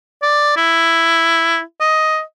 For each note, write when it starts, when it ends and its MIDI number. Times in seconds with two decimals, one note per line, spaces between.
0.22 0.56 74
0.56 1.61 64
1.80 2.21 75